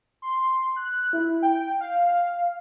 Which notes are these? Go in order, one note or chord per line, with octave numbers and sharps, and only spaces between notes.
C6
F#6
E4
G5
F5